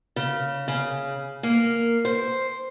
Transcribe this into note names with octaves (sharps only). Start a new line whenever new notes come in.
C#3
C#3
A#3
C5